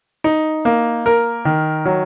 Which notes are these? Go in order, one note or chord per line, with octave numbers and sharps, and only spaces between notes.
D#4
A#3
A#4
D#3
F#3